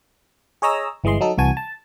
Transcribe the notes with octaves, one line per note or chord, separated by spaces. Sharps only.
G#4 C#5 D#5 A#5 E6
G1 E3 G#3 D#5 C6
F#3 D#4 A4
C2 E3 F#4 G#5 A5
A5